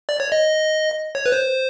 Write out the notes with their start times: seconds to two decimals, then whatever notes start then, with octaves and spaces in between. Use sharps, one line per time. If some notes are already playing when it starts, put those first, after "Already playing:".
0.09 D5
0.20 C#5
0.32 D#5
1.15 C#5
1.26 B4
1.32 C5